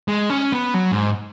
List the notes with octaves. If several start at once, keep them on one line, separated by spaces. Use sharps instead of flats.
G#3
C#4
B3
F#3
G#2